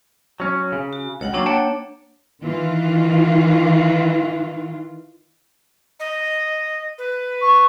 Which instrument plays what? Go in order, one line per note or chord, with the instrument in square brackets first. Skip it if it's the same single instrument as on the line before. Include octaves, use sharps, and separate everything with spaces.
[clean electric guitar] F#3 C#4
C#3
[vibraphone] F#4
[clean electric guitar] C#2 [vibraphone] C#5 F#5 G5
[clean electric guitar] F#3 F4 [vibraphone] A#3 D4 C#5
[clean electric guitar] F#5 G5 A5
[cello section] D#3 E3 F4
[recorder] D#5
B4
[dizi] C#6